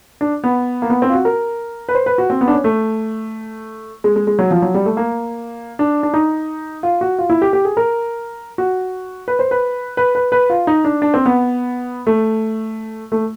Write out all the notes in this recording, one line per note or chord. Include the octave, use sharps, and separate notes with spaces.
D4
B3
A#3
B3
C4
F4
F#4
A#4
B4
C5
B4
F#4
C4
B3
D4
C#4
A3
G#3
G#3
G#3
F#3
F3
F#3
G3
A3
A#3
D4
D4
D#4
F4
F#4
F4
E4
G4
G4
G#4
A#4
F#4
B4
C5
B4
B4
B4
B4
F4
D#4
D4
D4
C4
B3
A3
A3